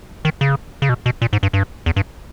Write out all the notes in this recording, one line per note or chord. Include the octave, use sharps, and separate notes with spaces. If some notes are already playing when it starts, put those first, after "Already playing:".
D#3
C#3
C#3
B2
B2
A#2
G#2
G2
G2
E2
G2